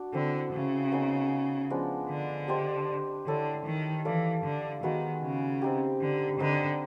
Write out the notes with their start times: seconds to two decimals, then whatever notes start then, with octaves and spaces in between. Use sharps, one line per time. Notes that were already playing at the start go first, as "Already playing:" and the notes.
Already playing: D4 F#4
0.13 D3 A3 C4 E4
0.53 C#3
0.92 B3 D#4 G#4 C#5
1.70 F3 G#3 B3 D4
2.09 D3
2.48 D4 G4 C5 D#5
3.27 D3 E4 A4 C#5
3.66 D#3
4.05 E3 E4 A4 D5 F5
4.44 D3
4.83 D#3 G#3 B3 D#4 F#4
5.23 C#3
5.62 C4 D#4 G4
6.01 D3
6.39 D3 C4 D#4 G4 B4